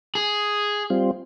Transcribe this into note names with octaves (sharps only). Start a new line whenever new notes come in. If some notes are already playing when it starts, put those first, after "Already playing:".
G#4
G3 C4 F4